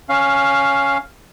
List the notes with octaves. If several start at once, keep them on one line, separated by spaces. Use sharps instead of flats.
C#4 F5